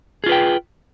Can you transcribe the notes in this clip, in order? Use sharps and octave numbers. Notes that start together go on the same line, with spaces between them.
F4 G#4 B4 G5